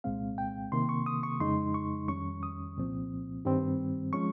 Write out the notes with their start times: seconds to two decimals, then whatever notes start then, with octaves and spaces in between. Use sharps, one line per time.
0.04 C2 A#2 G#3 C4 F5
0.38 G5
0.72 C3 D#3 A#3 C6
0.89 C#6
1.06 D#6
1.23 C#6
1.40 F2 C#3 G#3 D#4 C6
1.74 C#6
2.08 F2 D#3 G3 C#4 C#6
2.43 D#6
2.77 C2 A#2 F3 C4
3.45 G2 D#3 G3 C4
4.13 F3 G#3 C#4 C#6